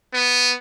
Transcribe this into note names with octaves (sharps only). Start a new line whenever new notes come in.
B3